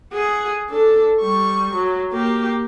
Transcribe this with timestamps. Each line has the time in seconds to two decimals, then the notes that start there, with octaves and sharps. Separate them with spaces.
0.13 G#4 F#5
0.70 D4 A4
1.21 G3 C#6
1.73 F#3
2.12 A#3 G4